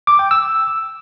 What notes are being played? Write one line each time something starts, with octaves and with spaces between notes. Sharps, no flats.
D6
G5
E6